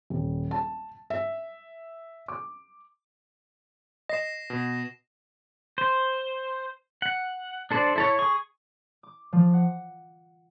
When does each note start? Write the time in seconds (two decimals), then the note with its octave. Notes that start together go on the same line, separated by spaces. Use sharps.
0.10 D#1
0.51 A5
1.10 E5
2.28 D6
4.09 D#5 A#6 C7 E7
4.50 B2
5.78 C5
7.02 F#5
7.71 D4 A4 C5 D5
7.96 E4 A4 C#5
8.19 G#4 C#6
9.03 D6
9.33 F3
9.53 F#5